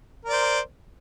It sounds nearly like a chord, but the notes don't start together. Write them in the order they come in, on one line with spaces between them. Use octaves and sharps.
A#4 D5 C5